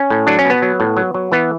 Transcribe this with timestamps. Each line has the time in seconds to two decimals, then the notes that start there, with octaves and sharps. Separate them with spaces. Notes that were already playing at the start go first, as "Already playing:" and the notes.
Already playing: C#4
0.10 A2
0.27 F#3 D4
0.39 C#4
0.45 B2 B3
0.62 F#3
0.80 A2
0.97 F#3
1.14 F#3
1.32 E3 B3